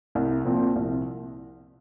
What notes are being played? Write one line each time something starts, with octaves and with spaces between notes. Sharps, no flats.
C2
A#2 F3 C4
C2